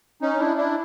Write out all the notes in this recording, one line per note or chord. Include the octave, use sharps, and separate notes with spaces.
C#4 D#4
D4 E4
D4 E4